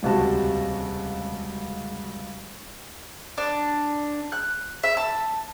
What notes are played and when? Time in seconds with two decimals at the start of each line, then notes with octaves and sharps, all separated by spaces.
0.03 D#1 C#2 C3 F#4 A5
3.38 D4
4.32 F#6
4.83 E5
4.97 A5